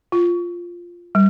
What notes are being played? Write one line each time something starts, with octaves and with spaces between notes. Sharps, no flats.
F4
G3